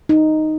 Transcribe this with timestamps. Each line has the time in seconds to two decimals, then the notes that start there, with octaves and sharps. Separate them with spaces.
0.09 D#4